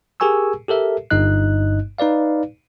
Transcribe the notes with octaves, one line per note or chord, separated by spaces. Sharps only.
G4 G#4 A#4 G#5 C#6 E6
G4 A4 A#4 E5
G1 G2 D#4 D#5 F#6
D#4 B4 D5 F5